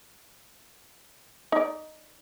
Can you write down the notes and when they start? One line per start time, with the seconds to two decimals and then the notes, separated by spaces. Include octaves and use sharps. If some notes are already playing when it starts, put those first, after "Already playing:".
1.52 D#4 D5